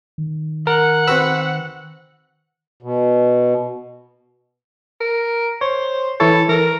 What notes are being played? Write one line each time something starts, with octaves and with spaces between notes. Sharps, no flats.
D#3
A#4 F#5
C4 F#4 B4 E6
B2
A#4
C5 C#5
E3 E4 A4 C#5
E3 A4 A#4